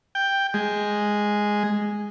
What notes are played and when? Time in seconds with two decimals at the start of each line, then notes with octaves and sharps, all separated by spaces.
0.15 G5
0.54 G#3